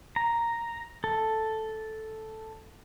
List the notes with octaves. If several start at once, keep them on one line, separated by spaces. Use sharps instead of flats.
A#5
A4